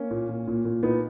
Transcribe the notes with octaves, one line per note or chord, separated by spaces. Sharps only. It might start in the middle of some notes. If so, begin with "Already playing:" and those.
Already playing: A#3 C#4
A#2
A#2
A#2
A#2
A#2 B3 D#4